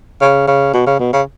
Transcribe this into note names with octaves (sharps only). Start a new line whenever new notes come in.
C#3
C#3
B2
C#3
B2
C#3